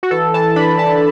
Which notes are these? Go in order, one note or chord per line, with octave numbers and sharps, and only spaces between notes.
F#4
E3 A4
E3 A5
D4 B5
E3 A5